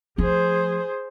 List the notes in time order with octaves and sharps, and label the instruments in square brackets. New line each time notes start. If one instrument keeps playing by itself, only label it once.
[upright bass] F3 A3 [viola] G#4 C5